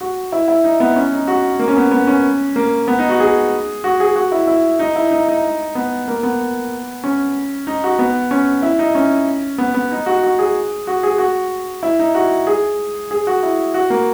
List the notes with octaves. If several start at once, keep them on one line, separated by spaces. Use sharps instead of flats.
F#4
E4
E4
D#4
B3
C#4
D#4
F#4
A#3
C#4
B3
B3
C#4
A#3
B3
D#4
F#4
G#4
F#4
G#4
F#4
E4
E4
D#4
E4
D#4
D#4
B3
A#3
B3
C#4
D#4
F#4
B3
C#4
E4
D#4
C#4
B3
B3
D#4
F#4
F#4
G#4
F#4
G#4
F#4
E4
D#4
F#4
G#4
G#4
F#4
E4
F#4
A#3